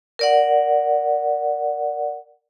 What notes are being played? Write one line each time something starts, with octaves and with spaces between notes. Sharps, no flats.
A#4 D5 F#5